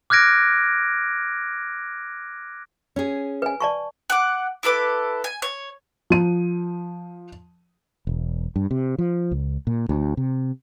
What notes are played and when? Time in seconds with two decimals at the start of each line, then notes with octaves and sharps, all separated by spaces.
0.10 D6 F6 F#6 G#6 A#6 D7
2.96 C#4 G#4
3.42 B4 G#5
3.60 D5 A5 C#6
4.10 F#5 D6
4.63 E4 A4 B4 D6
5.24 G#5
5.42 C#5
6.10 F3 D#7
8.07 E1
8.56 G2
8.71 C3
8.98 F3
9.31 C#2
9.67 A#2
9.89 D2
10.17 C3